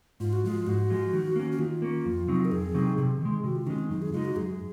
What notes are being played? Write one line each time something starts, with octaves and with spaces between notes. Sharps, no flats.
G#2 F4
F#4
F3 G#3 F4
G#2 F#4
F3 G#3
D#3
A#3 C#4
F#4
D#3 F4
A#3 C#4
F2
C3 F#3 C4 D#4
A#4
F2 G#4
C3 F#3 C4 D#4
C3 G#4
D#3 G#3
C3 F#4
F4
D#3 G#3 C#4
C4
F#2 D#4
G#4
C#3 G#3 D#4 F4
F#4
F#2 G#4